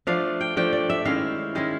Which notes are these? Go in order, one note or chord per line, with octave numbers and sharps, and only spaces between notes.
F3 A3 D4 F5
G5
F3 A3 D4 G5
D5
E5
D#3 G#3 C#4 E4 F5
D#3 G#3 C#4 E4